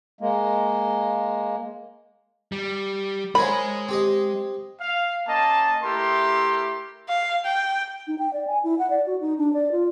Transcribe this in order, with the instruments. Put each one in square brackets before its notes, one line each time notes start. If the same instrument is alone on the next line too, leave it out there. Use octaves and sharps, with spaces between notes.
[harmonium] G#3 A#3
[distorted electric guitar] G3
[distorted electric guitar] G#3 G#5 [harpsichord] A#4 C5 C#5 [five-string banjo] B5
[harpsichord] C4 G4 D#5
[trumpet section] F5
A#3 C#4 D#5 A5
A3 E4 G4 A#4 C6
[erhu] F5
G5
[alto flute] D#4
G5
D5
G#5
E4
F#5
D5
F#4
D#4
D4
D5
F4